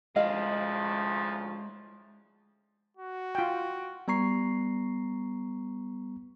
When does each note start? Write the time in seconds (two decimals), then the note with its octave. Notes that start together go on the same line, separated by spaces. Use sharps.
0.16 D2 C#3 F3 G#3 E4 D#5 F5
2.97 F#4
3.35 F4 G5
4.08 G3 B3 A#5 C#6 C7